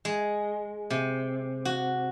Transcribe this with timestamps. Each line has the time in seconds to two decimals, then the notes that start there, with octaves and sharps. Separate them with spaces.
0.05 G#3
0.90 C3
1.65 F#4